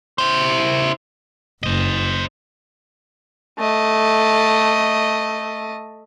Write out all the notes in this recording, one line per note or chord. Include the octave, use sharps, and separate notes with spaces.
E4 C5
F#1 C5 D#5
A3 D#5